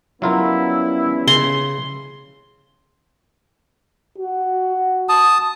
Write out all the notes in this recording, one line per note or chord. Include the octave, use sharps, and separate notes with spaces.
F#3 G3 B3 C#4 E4 F4 A#4
C#3 C6
F#4
A5 D#6